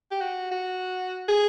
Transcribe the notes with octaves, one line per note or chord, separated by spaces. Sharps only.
G4
F#4
F#4
G#4